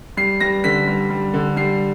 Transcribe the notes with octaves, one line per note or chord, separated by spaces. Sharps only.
G3 C7
G3 A#6
D3 B6
G3
G3
D3
G3 C7